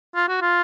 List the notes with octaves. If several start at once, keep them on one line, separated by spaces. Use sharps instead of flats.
F4
F#4
F4